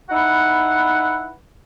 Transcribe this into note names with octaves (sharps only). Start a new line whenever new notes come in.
D#4 E4 B4 F#5